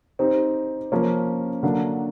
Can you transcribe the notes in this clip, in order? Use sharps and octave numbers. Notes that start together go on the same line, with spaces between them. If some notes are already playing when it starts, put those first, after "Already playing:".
C4 D#4 G4 C5
F3 A#3 C#4
D3 F#3 A#3 D4